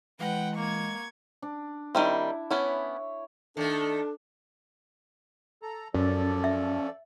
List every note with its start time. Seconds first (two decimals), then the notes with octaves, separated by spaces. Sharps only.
0.20 E3 G#3 B4 F#5 G5
0.57 A#3 C#6 G#6
1.42 D4
1.95 D#3 G3 C4 E4
2.51 B3 C#4 E4 C#5
3.57 D#3 A3 D4 A4
5.63 A4 A#5
5.94 F#2 F3 C#4 A4 D5
6.44 E5